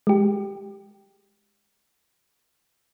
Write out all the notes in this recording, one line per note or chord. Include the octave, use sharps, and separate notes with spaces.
G#3 G4